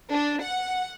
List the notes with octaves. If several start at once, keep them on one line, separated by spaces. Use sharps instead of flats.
D4
F#5